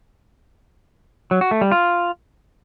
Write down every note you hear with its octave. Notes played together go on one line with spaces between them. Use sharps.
F#3
F#4
A3
G3
F4